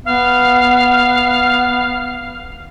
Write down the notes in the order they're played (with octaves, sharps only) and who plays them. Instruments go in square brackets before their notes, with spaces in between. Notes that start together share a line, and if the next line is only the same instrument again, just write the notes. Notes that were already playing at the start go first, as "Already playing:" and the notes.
[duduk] B3 [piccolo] F5